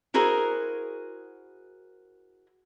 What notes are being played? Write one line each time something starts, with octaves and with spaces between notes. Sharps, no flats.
E4 F#4 G#4 A#4 C5